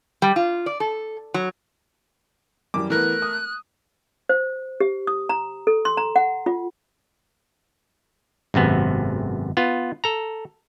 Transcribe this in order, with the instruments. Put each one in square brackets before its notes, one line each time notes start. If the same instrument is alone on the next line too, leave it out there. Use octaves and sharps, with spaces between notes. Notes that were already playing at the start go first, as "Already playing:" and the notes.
[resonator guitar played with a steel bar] G3
F4
D5
A4
F#3
[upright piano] F#2 E3 G3 [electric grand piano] D6
[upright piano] E3 B3 [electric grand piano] A3 A#4 [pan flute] F#6
[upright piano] D#6
[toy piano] C5
G4
D#6
A#5
A4
C6
A#5
F#5
F4
[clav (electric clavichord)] G#1 F#2 C3 B3
B3 F4
A4 A#5